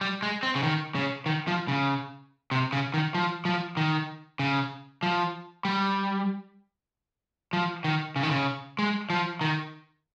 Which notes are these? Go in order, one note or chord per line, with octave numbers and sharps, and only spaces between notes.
G3
G#3
C4
C#3
D#3
C#3
D#3
F3
C#3
C3
C#3
D#3
F3
F3
D#3
C#3
F3
G3
F3
D#3
C#3
D#3
C#3
G#3
F3
D#3